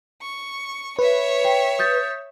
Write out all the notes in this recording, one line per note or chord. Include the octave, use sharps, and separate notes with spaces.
C#6
B4 C#5 E5
G5
D#6 G6 A6